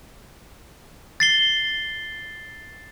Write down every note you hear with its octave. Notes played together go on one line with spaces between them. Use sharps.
A6 C7 G7